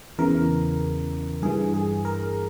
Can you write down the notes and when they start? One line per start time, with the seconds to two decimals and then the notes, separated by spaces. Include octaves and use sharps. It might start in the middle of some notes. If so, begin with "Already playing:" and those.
0.18 E2 C#3 E3 A#4
1.42 G2 E3 G#4
1.74 G#4
2.05 A#4